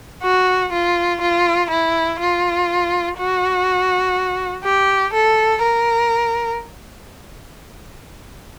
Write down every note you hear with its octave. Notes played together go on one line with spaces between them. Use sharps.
F#4
F4
F4
E4
F4
F#4
G4
A4
A#4